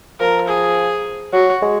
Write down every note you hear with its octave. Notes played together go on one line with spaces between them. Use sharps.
F3 A#4
G#4
F#3 F#4
G#3